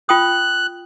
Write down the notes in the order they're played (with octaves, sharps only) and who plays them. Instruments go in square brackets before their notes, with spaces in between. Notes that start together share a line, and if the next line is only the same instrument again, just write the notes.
[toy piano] F4 G5 D#6 [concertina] F#6